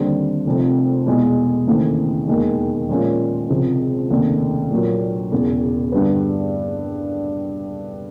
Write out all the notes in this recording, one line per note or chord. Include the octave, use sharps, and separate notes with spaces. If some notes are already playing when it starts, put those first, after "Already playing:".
Already playing: D#2 D3 G3 C4
F1 F2 C3 F3
E2 B2 G#3
D#2 C#3 E3 A3 C4
E1 D#2 D#3 G#3
A#2 F3 G#3 C#4 F4
C#2 C3 F3
F1 D#2 C#3
A#1 A#2 F#3
E1 E2 C#3
G2 D3 G3 B3